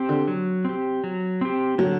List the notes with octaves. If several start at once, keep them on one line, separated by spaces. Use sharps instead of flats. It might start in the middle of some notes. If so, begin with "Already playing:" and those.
Already playing: C4 G4
D3
F#3
C4 G4
F#3
C4 G4
D3 F#3